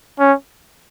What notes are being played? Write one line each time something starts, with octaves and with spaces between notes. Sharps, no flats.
C#4